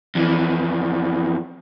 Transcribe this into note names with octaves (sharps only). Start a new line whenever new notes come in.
F2 E3